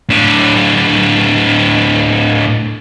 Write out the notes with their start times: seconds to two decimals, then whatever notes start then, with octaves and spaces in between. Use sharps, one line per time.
0.10 A2 D4